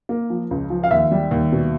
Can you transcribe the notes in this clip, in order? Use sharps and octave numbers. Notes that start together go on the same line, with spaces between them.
A#3
F3
C#2
F3
F5
D#2 E5
G3
D#2
B2